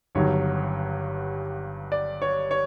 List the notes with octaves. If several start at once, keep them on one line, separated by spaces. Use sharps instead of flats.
G1 G2 D#3 F#3 C#5
D5
C#5
C#5